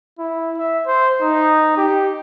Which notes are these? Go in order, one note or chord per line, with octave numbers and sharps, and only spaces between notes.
E4
E5
C5
D#4
G4